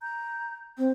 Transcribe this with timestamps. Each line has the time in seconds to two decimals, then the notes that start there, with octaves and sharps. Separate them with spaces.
0.02 A#5 G6
0.78 C4 C5